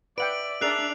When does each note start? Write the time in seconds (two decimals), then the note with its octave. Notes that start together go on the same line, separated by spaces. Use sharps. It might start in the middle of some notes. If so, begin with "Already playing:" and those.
0.18 B4 D5 E5 F#5 G5 D7 F#7
0.61 D4 G#4 A#4 E5 F#6 C7 F7